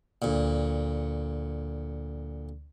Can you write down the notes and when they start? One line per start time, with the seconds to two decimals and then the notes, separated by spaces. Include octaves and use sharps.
0.22 D2 A#2